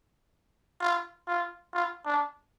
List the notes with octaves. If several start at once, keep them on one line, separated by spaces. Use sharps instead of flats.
F4
F4
F4
D4